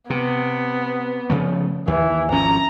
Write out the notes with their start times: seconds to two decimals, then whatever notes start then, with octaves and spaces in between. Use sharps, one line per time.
0.10 C3 B3
1.30 C#3 F3 A3
1.88 D#2 E3
2.32 G#1 F3 C#4 A#5